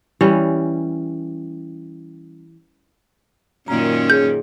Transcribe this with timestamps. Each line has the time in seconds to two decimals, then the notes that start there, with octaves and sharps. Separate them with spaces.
0.21 E3 G3 C#4
3.68 F#2 A#2 D#3 C#4 A#5
4.10 G#4 C#5 G6